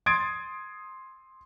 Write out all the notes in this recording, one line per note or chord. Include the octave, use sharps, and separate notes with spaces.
C6 D#6 G#6 A6 D7